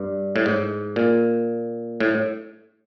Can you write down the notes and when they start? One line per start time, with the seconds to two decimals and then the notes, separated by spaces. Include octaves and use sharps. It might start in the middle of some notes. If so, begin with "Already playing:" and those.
Already playing: G2
0.36 A2
0.46 G#2
0.96 A#2
2.00 A2